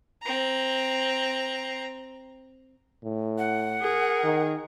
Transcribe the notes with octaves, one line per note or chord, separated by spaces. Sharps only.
C4 A#5
A2
F#5
G#4 A#4
D#3